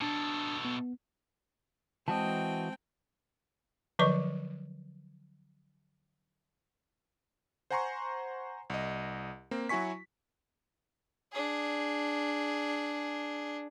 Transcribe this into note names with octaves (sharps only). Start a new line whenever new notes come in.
B2 D4 A4 A5
B3
E3 G#3 C4 F#4 D#5 G5 A5
D3 F3 F#3 B4 D#5 C#6
C5 F#5 G#5 A#5 C6 C#6
C2 D#5
A#3 C4
F#3 E4 F#4 G#5 C#6 B6
D4 G#4